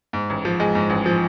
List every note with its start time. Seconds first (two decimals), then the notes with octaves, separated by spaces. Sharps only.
0.13 G#2
0.30 A1
0.45 F3
0.60 G#3
0.75 G#2
0.90 A1
1.06 F3